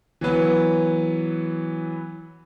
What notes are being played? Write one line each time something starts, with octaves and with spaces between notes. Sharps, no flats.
E3 F#3 B3